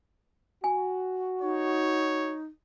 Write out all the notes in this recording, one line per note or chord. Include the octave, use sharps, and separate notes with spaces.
F#4 G#5
D#4 C#5